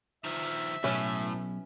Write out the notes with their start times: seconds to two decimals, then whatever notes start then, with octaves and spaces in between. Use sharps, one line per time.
0.24 D#3 F3 E5
0.84 B1 A2 C#4 E4 B4